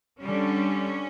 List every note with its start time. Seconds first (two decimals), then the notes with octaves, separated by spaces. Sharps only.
0.23 D3 G3 C#4